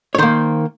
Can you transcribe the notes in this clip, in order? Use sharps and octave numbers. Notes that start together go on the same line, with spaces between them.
C#5
D#3 A#3 C5